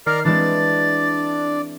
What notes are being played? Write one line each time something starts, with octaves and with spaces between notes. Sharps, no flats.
D#3 A#4 D5 F6 C7
E3 G#3 C4 D4 D5 A6